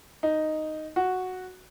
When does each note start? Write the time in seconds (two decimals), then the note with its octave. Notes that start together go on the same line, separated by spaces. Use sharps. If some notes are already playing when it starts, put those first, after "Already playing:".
0.23 D#4
0.96 F#4